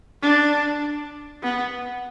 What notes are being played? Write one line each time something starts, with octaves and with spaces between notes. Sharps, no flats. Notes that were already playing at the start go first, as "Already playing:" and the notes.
D4
B3